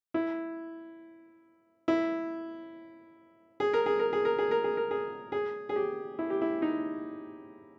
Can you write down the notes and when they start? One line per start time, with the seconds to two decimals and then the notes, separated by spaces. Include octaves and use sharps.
0.14 E4
1.88 E4
3.60 G#4
3.74 A#4
3.86 G#4
3.99 A#4
4.13 G#4
4.25 A#4
4.39 G#4
4.51 A#4
4.64 G#4
4.77 A#4
4.91 G#4
5.32 G#4
5.69 G#4
5.76 G4
6.19 E4
6.30 G4
6.41 E4
6.62 D#4